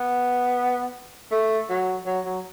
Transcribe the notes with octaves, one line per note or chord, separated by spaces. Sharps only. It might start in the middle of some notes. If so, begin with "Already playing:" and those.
Already playing: B3
A3
F#3
F#3
F#3